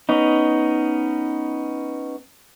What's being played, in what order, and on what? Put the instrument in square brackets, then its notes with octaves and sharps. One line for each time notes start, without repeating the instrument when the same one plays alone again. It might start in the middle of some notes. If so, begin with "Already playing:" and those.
[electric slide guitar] B3 C#4 D#4